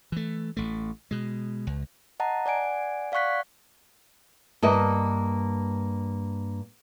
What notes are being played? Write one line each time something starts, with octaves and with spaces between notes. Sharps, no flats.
E3 A3
A1 A3
B2 G#3
C#2
D#5 F#5 A5 A#5
D5 F#5 G#5 D7
D5 F5 F#5 C#6 F#6 B6
G2 A#3 D#5